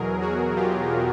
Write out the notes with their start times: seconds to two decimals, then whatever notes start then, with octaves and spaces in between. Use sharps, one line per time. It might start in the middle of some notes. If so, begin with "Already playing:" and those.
Already playing: E2 B2 F#3 G#4 A#4
0.21 F#4 G#4
0.56 F4 G4